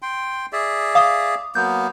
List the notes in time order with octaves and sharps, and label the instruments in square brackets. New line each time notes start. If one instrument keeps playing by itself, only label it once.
[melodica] G5 C6
G#4 D5 E5
[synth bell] F5 D6 D#6
[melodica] F#3 A#3 B3 [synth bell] G6